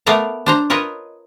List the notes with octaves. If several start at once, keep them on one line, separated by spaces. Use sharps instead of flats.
A3 B3 A#4 D5 F5 A#5
D4 C5 A#5
F4 A#4 B4 C#5 D#5